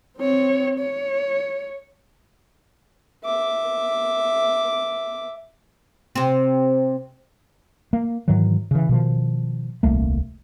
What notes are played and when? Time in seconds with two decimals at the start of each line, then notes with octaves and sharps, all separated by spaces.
0.18 C4 C#5
0.80 C#5
3.24 E5 D6
6.15 C3 C4
7.93 A#3
8.28 G#2 D#3 E3 F#3
8.71 C#3 E3
8.89 B2 D#3 F3
9.83 D#1 C2 A3 A#3